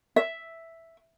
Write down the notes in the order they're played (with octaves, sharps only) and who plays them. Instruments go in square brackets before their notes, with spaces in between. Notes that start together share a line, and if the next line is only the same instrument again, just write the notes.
[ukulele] E5